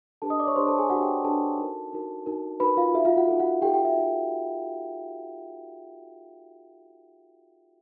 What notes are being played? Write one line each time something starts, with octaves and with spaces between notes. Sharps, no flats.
D4 G4 A4 B4 A5
D#5 D#6
D5 D6
C#5 C#6
D4 G4 B4 C5 C6
A4 A5
G#4 G#5
D4 F#4 G4 B4 F#5
G4 G5
D4 G4 A4 B4 A5
D#4 F#4 A#4
D#4 F#4 A#4
D#4 F#4 A#4
D#4 F#4 A#4 B4 B5
F4 F5
D#4 F#4 A4 E5
F4 F5
F#4 F#5
D#4 F#4 A4
F#4 F#5
D#4 F#4 G4 A4 G5
G4 G5
E5
D#4 F#4 A4